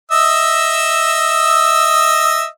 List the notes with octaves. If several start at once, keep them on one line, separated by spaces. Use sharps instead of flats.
D#5 E5 E6